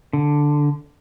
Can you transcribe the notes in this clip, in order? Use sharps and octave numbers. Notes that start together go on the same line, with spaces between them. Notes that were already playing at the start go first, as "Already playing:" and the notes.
D3